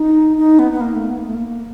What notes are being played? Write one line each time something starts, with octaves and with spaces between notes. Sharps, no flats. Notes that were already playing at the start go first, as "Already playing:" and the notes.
Already playing: D#4
D#4
B3
B3
A#3
A3
B3
A#3
A3
A#3